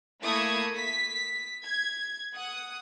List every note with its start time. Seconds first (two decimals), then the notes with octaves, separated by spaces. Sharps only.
0.22 A3 A#3 E4 C#6 D#6 G#6
0.76 B6
1.64 G#6
2.35 F#5 D#6